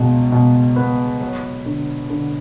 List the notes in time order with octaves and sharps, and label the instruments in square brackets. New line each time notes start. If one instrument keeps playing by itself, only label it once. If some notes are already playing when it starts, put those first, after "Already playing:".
Already playing: [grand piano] C#2 B2
B2
B3
F#3
D3
D3